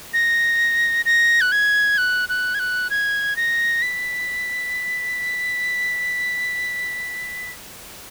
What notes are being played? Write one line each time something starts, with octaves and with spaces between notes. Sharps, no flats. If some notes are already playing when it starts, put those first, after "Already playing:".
A#6
A#6
F#6
G#6
F#6
F#6
G#6
F#6
G#6
A#6
B6